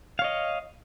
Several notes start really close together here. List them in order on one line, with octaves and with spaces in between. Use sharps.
F5 C#5 D#5